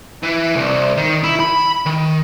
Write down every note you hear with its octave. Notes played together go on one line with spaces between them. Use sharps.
E3
C2
D#3
E4
B5
D#3